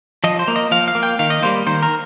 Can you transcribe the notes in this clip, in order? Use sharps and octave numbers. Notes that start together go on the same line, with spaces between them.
F3 D#5
C5
A#3
D#5
F3 F5
F5
A#3
G5
D#3 F5
D#5
G3 A#3 C5
D#3 C5
A#4